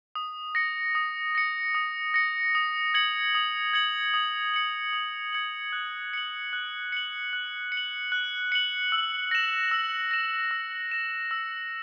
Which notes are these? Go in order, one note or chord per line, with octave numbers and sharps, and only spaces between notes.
D#6
A#6 C#7
D#6
A#6 C#7
D#6
A#6 C#7
D#6
G#6 C#7 F#7
D#6
G#6 C#7 F#7
D#6
G#6 C#7 F#7
D#6
G#6 C#7 F#7
F#6
C#7 F#7
F#6
C#7 F#7
F#6
C#7
F#7
F#6
C#7 F#7
E6
A#6 E7
E6
A#6 E7
E6
A#6 E7
E6